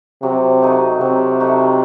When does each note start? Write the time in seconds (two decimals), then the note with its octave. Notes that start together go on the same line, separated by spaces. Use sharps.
0.22 C3 F#3
0.62 A3 D#4 F#4
1.01 C3 F#3
1.40 A3 D#4 F#4